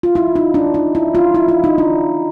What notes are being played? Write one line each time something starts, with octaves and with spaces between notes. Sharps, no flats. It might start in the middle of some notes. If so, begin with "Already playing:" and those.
F4
E4
D#4
D4
D#4
E4
F4
E4
E4
D#4
D4